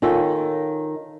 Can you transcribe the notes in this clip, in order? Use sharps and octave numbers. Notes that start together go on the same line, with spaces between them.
D#3 C#4 F4 A4